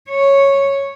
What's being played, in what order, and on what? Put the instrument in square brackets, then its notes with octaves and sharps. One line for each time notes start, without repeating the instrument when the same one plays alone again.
[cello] C#5